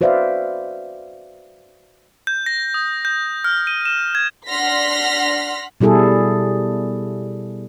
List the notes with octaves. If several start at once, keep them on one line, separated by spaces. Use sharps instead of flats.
F#4 B4 C5 D5 E5 F5
G6
A#6
D#6
G6
F6
D#7
E7
G#6
D4 F#5 C6 F6 A#6 B6
B2 G3 E4 G#4 A4